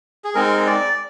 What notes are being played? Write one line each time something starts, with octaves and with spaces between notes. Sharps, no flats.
G#4
G#3 C4 D#4 A#4
D5